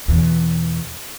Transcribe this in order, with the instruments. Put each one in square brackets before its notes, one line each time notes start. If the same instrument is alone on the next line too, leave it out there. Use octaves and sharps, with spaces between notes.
[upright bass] E2 B2